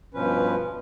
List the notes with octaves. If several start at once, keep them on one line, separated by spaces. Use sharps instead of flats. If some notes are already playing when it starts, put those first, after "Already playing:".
G2 B2 F3 C#4 B4